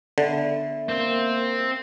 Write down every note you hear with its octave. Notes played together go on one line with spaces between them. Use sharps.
D3 B3 E5
A#3 C4